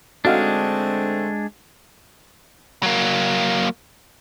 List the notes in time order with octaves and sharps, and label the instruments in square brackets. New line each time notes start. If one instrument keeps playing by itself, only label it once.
[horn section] D3 A3 C4 [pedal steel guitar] G#3 D4 [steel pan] D#4 F#4 F5
[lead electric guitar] F#3 A#3